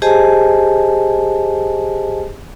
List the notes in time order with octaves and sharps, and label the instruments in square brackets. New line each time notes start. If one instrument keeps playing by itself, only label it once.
[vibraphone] G4 G#4 C5 D#5 G#5 A5